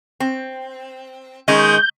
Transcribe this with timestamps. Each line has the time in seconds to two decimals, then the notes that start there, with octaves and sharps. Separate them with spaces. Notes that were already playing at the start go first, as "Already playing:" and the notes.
0.20 C4
1.48 D#3 G#3 C#4 D#5 G6